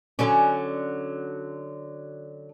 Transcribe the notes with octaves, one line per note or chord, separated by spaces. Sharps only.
D3 F#3 C#4